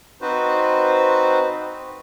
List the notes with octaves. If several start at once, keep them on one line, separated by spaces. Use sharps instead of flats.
C4 D#4 F#4 B4 C5